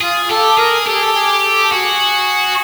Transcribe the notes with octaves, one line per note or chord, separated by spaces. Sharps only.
F4 G#4
G4 A4
G#4 A#4
G4 A4
G#4
A4
G#4
A4
F#4 G#4